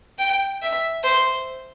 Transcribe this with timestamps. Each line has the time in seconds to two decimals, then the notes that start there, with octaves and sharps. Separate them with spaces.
0.19 G5
0.62 E5
1.04 C5